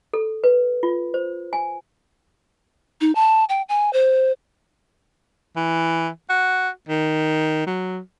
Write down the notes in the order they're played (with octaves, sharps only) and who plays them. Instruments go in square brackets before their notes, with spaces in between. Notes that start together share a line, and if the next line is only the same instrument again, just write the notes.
[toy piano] A4
B4
F4
C5
G#5
[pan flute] D#4
A5
G5
G#5
C5
[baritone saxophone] E3
F#4
D#3
F#3